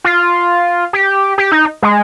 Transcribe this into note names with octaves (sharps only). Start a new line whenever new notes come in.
F4
G4
G4
D#4
G#3